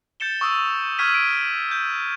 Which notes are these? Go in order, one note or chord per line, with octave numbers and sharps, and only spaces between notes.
G6 A6 C#7 E7 G7
C#6 D#6 E6
C#6 E6 F6 G#6 B6 D#7
D7
G6